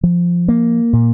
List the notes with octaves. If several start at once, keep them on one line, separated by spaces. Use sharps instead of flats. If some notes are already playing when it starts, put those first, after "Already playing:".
F3
A#3
A#2